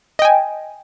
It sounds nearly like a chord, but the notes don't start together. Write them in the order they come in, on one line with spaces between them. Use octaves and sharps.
D#5 G5 G#5